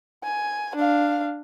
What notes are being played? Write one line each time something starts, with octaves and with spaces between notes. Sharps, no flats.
G#5
D4 F5